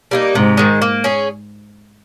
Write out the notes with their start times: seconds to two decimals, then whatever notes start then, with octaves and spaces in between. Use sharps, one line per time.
0.11 G3 A#3 D#4
0.35 G#2 C3
0.57 D#3 G#3
0.82 A#3
1.04 C#4 G#4